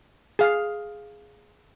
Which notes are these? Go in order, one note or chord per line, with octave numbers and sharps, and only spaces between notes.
G#4 F5